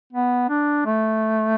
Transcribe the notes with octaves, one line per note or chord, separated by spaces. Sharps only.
B3
D4
A3